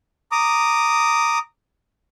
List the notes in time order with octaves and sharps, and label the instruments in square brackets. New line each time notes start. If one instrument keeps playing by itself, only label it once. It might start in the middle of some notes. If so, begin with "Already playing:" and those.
[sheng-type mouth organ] A#5 D6 D#6